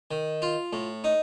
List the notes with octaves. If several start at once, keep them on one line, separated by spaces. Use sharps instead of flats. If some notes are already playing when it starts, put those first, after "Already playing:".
D#3
F4
A2
D#4